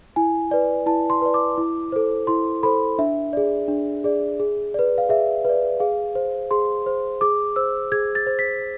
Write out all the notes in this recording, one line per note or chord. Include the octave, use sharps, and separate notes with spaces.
E4 G#5
B4 D5
E4 A5
C6
B4 D5
D6
E4
A4 C5
E4 C6
A4 C5 B5
D4 E5
G#4 D5
D4
G#4 D5
G#4
B4 D5
F5
G#4 E5
B4 D5
G#4 F5
C5
G#4 C6
C5
G#4 D6
C5 E6
G#4 G#6
A6
C5
B6